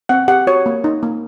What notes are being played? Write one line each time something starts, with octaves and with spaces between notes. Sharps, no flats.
C4 F#5
G4 F#5
F#4 C#5
A#3
D#4
A#3